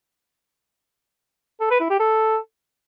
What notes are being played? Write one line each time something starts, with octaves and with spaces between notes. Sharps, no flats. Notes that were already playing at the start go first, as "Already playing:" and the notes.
A4
B4
E4
G4
A4